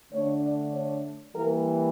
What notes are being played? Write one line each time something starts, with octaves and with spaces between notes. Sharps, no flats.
D3 A3 D4 C#5
D5
C#5
E3 G3 A#3 A#4